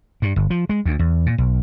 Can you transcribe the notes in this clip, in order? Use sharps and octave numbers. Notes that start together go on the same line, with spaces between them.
G2
G1
F3
G#3
D2
E2
A#2
B1